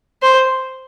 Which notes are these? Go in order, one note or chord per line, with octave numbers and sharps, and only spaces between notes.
C5